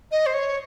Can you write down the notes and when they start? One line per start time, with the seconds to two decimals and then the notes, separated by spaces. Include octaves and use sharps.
0.11 D#5
0.26 C5
0.34 C#5